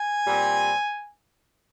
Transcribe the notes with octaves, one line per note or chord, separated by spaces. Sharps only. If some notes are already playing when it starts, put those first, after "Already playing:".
Already playing: G#5
A#2 G3 C4